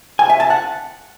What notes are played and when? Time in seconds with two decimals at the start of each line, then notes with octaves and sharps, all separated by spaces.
0.19 G#5
0.29 E5
0.40 A5
0.50 F#5